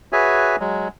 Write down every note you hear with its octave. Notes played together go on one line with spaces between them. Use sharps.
F#4 G#4 B4 C#5 E5 G#5
F#3 G#3